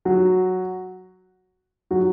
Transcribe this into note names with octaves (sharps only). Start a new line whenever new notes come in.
F#3 F#4
F#3 F#4